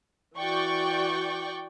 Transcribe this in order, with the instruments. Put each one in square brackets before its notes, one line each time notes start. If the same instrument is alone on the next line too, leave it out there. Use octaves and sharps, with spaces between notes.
[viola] E3 F#4 [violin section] D5 G5 C#6